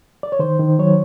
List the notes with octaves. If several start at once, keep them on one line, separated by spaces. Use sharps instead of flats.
D5
C#5
D#3 C5
D#3
F#3 C#5